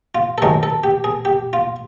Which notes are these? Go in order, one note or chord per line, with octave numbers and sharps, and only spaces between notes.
F4
A4
F#2 D#3 G#3 C#4 A#4
A4
G4
G#4
G4
F4